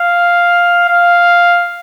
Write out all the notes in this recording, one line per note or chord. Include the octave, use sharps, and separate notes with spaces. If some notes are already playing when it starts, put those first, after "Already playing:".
Already playing: F5
F5